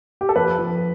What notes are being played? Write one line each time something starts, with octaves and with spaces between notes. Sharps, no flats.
G4
A4
F2 B4
F3